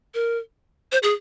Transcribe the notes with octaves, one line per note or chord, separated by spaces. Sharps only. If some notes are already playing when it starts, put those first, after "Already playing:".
A#4
C5
G#4